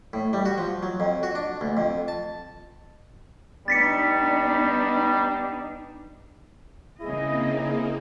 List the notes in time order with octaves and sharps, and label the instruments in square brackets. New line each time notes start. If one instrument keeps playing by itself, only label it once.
[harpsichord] A2
G3
F#4
F3
F#3
F2
F#4
D4
D2
F2
A5
[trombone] G3 [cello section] B3 D4 D#4 [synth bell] A6 B6 C#7
[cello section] C#3 D#5 [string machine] A#3 C4 D#4 [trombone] E4 [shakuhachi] G#4